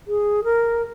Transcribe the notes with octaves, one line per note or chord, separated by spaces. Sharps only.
G#4
A#4